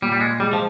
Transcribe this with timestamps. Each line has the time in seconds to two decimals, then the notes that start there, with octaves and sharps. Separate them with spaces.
0.02 A#2 G3
0.12 G3
0.20 G#3
0.40 G3 G#3
0.53 F3